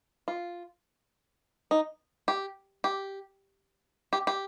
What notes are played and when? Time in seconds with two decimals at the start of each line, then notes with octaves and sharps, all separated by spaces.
0.28 F4
1.71 D#4
2.28 G4
2.84 G4
4.13 G4
4.27 G4